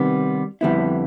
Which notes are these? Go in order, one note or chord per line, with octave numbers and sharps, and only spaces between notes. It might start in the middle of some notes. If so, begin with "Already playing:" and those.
Already playing: C3 D#3 G3 B3
F2 D3 G3 B3 E4